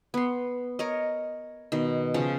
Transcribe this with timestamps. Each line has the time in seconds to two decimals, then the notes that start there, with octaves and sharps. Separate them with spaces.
0.14 B3 C6
0.79 A#4 C#5 D#5
1.72 B2 D#3
2.14 C#3 F3 C#4